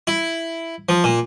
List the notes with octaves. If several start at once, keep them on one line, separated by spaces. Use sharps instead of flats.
E4
F3
A#2